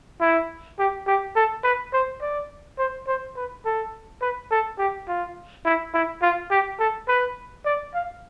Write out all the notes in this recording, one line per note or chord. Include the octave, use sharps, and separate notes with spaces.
E4
G4
G4
A4
B4
C5
D5
C5
C5
B4
A4
B4
A4
G4
F4
E4
E4
F4
G4
A4
B4
D5
F5